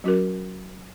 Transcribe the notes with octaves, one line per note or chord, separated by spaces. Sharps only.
F#3 C#4 F#4 A#4